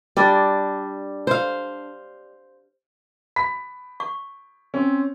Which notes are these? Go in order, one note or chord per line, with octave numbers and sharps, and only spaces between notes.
G3 D4
C5 F5
B5 B6
C#6
C4 C#4